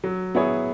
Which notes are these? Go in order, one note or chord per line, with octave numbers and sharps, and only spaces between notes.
F#3
B3 E4 G#4 C#5